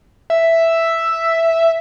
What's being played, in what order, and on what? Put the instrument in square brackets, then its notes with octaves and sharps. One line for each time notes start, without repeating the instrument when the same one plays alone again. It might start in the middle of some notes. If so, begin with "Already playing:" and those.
[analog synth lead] E5